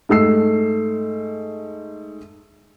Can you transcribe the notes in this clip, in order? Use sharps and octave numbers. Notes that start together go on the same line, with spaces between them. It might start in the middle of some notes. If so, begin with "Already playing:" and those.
G#2 A3 E6 C7